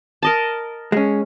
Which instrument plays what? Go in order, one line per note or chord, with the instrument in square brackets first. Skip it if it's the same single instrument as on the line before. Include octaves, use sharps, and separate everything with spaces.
[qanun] A#4 D#5 A5
[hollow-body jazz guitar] G#3 C#4